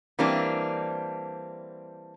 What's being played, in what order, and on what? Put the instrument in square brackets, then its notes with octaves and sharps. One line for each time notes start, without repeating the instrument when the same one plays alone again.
[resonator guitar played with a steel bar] E3 G3 A#3 C4 D4